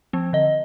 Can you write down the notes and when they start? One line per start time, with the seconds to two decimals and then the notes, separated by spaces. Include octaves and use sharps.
0.13 F3 C4
0.33 D3 D#5